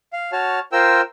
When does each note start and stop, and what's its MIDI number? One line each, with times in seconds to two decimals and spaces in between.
0.13 0.31 77
0.32 0.59 66
0.32 0.59 73
0.32 0.59 81
0.32 0.59 89
0.72 1.01 65
0.72 1.01 70
0.72 1.01 72
0.72 1.01 79
0.72 1.01 88